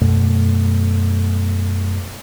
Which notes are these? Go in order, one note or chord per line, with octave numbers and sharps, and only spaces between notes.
F#2 B2 A3